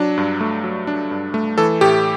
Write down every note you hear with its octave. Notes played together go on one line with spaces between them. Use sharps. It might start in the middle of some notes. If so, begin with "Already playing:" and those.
Already playing: F#3 D4
G2
A3
F#3
D4
G2
A3
E3 A4
A2 G4